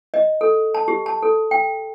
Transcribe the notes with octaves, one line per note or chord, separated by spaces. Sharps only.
D#5
A4
A5
G4
A5
A4
G5